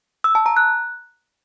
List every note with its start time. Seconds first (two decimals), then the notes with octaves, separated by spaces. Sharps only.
0.24 E6
0.35 A5
0.46 A#5
0.57 F#6